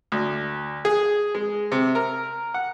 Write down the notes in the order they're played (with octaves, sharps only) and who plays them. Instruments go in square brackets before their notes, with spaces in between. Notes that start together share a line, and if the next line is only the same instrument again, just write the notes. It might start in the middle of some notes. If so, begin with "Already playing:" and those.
[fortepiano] D2
G#4
G#3
C3
A#4
F#5